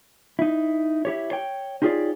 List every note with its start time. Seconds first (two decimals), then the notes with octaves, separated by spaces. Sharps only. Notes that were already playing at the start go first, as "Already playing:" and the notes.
0.39 D#4 E4
1.05 E4 G4 C#5
1.31 C#5 G5
1.82 D#4 F4 G4 G#4 C#5 D5